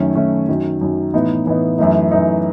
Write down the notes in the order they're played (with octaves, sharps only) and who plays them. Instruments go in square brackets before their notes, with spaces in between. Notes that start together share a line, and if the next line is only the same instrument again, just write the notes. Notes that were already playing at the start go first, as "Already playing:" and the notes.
Already playing: [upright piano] F#2 D#3 A3 C#4
F#2 D#3 A3 C#4
F#2 D#3 F#3
F#2 D#3 F#3
A2 E3 B3 D#4
A2 E3 B3 D#4
F#2 E3 A3 D#4
F#2 E3 A3 D#4